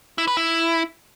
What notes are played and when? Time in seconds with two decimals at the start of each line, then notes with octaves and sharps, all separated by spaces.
0.18 E4
0.28 B4
0.37 E4